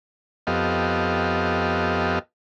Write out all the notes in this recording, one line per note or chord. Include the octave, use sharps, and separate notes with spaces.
F2 B3 G4 A4 D#5 F5